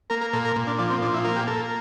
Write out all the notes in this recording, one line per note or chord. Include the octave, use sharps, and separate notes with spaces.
A#3 A#4
A#4
A#2 A4
A#4
A#2
D4
F3 D4
C4
A#2 D4
E4
A#3 F4
G4
A#3 A4